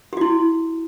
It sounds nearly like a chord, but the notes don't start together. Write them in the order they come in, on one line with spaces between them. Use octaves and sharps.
G4 F#4 E4